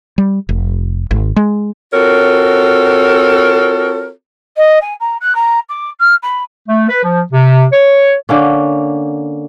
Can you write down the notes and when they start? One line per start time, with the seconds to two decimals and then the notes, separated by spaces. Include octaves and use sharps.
0.18 G3
0.49 F1
1.11 G#1
1.36 G#3
1.94 C4 F4 F#4 A4 A#4 C#5
4.57 D#5
4.82 G#5
5.00 A#5
5.21 F#6
5.35 A#5
5.69 D6
5.99 F6
6.23 B5
6.69 A3
6.88 B4
7.04 F3
7.33 C3
7.73 C#5
8.29 D3 A#3 C#4